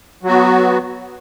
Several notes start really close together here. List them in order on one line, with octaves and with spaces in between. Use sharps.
F#3 F#4 B3